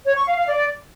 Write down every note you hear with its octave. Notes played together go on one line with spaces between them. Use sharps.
C#5
C#6
F5
F5
D5